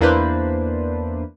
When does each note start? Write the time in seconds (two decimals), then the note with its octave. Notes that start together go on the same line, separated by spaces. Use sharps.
0.01 E2 A#3 D4 E4 B4 C5